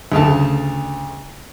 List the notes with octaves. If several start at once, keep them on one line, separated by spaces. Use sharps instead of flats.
D2 C#3 A3 A5